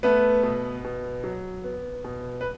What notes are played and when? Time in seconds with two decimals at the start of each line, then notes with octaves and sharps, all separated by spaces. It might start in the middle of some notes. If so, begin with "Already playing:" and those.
0.03 A3 B3 B4
0.43 B2
0.84 B2
1.24 F#3
1.64 B3
2.04 B2
2.41 B4